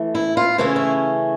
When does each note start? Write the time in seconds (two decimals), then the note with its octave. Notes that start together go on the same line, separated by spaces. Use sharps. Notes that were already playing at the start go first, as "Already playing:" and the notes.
Already playing: E3 A3
0.15 E4
0.37 F4
0.58 C#3 E3 A3 C#4 E4
0.76 E4